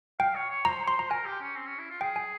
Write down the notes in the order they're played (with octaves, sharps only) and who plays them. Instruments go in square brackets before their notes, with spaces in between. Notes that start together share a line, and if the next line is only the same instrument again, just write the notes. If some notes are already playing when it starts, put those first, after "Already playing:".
[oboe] F5 [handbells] G5
[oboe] C#5
C#5
[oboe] C5 [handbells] A#5
[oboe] C#5
[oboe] C5 [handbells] C6
[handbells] A#5
[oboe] A#4 [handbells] G#5
[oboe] G4
C#4
C4
C#4
E4
F4
[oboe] G#4 [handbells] G5
[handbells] G#5